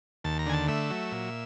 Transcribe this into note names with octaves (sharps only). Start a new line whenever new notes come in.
D#2 A5
A#5
D3 G#5
A5
A3 E5
F#3
A#2